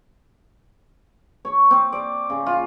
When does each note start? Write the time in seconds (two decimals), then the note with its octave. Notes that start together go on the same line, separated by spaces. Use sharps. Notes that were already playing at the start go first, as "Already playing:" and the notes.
1.45 C#5
1.71 C4
1.93 D5
2.30 C#3
2.46 F4